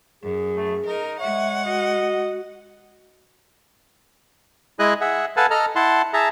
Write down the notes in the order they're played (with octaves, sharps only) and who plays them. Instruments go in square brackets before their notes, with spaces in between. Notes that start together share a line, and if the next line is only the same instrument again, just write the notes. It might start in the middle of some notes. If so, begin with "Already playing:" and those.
[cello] F#2 [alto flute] G#4
[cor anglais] A3
[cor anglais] D#4 [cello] A#4
[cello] G#3 F#5 [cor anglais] C#5 [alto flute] E5
[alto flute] F#4 [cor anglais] D#5
[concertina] G#3 E4 G#4 D#5 G#5 F#6
G#4 E5 F#5
A4 B4 F5 F#5 G#5 A5
A4 D#5 A#5 F6
E4 F#5 A5 C6
G#4 E5 A5 A#5